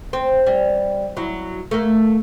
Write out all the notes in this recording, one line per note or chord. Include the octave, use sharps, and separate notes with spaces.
C4
G3
F#3 E4
A3 A#3